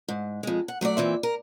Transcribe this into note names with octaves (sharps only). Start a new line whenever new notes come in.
G#2
F2 G#3
F#5
F#3 A3 F#4 D5
A#2 E3 C4 E5
A#4